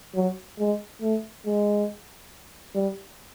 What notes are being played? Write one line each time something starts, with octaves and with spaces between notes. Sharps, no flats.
F#3
G#3
A3
G#3
G3